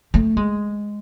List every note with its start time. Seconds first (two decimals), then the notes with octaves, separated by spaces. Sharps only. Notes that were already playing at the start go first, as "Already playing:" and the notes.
0.14 A3
0.37 G#3